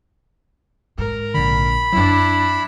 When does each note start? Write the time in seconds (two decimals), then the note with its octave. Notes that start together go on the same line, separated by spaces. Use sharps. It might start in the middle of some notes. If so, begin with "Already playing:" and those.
0.98 G#2 A#4
1.34 A#1 D3 B5
1.93 F#2 F#3 C4 D4 E4